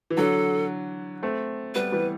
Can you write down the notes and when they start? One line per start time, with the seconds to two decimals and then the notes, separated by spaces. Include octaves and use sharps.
0.10 E3
0.17 D3 F#3 A4
1.23 A3 C4
1.75 G3 B3 B4
1.92 E3 G3